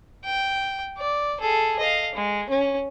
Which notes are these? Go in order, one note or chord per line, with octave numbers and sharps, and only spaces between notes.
G5
D5
G#4 A4
D#5 F5
G#3
C#4